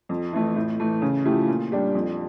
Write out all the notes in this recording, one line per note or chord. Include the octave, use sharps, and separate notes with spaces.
F2
E3 A3 E4
A2
E3 A3
C#3
F3 A3 E4 G4
A#2
G3 D4 G4
F2